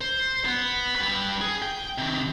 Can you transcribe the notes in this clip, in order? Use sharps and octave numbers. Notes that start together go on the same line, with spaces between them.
C5
B3
G3 B4
G#4
G5
C3 D#3